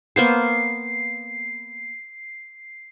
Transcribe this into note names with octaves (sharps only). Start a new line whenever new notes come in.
A#3 B3 C5 C7